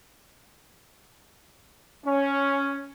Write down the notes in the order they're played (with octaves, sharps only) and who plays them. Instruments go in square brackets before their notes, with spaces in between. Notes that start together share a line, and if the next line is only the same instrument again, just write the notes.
[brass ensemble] C#4